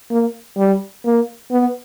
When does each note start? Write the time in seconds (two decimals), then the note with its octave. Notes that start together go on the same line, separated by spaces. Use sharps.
0.11 A#3
0.57 G3
1.05 A#3
1.51 B3